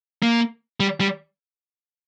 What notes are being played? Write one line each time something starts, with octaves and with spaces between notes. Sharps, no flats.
A#3
G3
G3